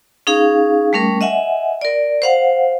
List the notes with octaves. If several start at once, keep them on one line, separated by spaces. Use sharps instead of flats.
C#4 D#4 G#4 F5
G3 A3 C#4 A#4
D#5 E5 F#5 G#5
A#4 D5
C5 F5 F#5